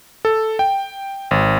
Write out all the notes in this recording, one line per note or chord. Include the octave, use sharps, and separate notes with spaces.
A4
G5
G#1